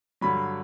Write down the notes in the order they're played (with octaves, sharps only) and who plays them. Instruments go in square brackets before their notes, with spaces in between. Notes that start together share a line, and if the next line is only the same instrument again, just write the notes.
[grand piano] G2 D3 F#3 B5